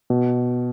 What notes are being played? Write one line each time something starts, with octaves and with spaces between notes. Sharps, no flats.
B2